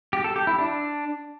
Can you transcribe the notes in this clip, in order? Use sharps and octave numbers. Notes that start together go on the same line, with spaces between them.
G4
A4
G4
E4
D4